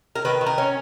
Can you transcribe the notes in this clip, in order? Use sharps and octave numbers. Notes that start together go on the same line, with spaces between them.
A#4
D#3 B4
D#3
A#4
C#4